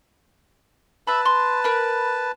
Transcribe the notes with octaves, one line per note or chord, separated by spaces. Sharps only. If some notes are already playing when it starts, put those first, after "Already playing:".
B4 E5 A5 B5
C6
A#4 B5 F#6